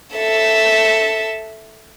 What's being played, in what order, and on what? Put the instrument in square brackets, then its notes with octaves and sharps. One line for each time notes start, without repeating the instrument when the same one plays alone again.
[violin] A4 E5